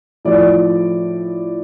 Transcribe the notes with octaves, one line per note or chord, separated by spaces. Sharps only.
A2 F3 D5